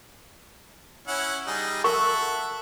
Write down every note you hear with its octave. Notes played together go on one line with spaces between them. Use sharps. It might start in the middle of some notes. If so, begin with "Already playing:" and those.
C#4 E4 F#5
G3 D#4 G#4
A4 A#4 E5 F#5 C#6